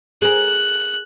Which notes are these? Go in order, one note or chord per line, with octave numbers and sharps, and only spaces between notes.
G#4 A#4 F#6